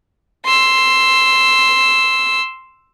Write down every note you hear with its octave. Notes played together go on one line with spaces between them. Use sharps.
C6 E6